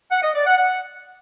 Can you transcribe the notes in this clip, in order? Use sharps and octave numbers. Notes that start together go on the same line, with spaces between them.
F#5
D#5
D5
F#5
F#5